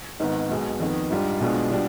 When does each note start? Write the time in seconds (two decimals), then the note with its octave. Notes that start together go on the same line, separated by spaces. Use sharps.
0.20 G#1 G#2 D#3 B3
0.49 B1 B2 G#3
0.80 F2 D#3 B3
1.10 G#2 G3 D4 F4
1.40 B1 B2 G#3 D4 F4
1.71 B2 G3 D4 F4